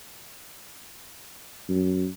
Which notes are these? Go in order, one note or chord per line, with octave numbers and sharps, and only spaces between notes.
F#2